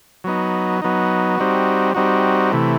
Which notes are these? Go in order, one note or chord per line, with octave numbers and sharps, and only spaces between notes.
F#3 B3 D#4
F#3 B3 D#4
G3 C4 D#4 F#4
G3 C4 D#4 F#4
C3 E3 A3